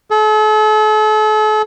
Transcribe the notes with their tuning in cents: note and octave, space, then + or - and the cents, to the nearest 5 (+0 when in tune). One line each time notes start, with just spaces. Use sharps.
A4 -40